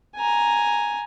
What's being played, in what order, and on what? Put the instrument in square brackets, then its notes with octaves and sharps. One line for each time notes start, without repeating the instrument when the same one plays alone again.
[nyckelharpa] G#5 A#5